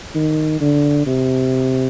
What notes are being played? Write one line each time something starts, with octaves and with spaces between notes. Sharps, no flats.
D#3
D3
C3